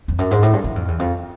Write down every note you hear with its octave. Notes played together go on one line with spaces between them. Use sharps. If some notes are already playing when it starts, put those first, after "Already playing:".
F2
F#2
G#2
A2
G2
F#2
F2
E2
F2